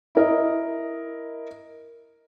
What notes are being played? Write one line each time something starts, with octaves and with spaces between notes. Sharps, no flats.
E4 A#4 D#5